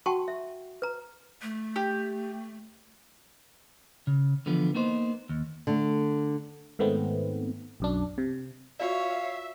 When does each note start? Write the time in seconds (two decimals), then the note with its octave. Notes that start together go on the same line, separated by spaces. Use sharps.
0.06 F#4 F#5 G5 A5 C6 C#6
0.28 E5
0.82 B4 A#5
1.42 A3
1.76 G4
4.07 C#3
4.46 D3 E3 F3 B3
4.75 A#3 B3 D#4 C5
5.29 D#2
5.67 D3 A3
6.79 G#2 D#3 A3 B3 C4
7.80 B1 F#2 D4
8.18 C3
8.79 F4 F#4 C#5 D5 E5 F5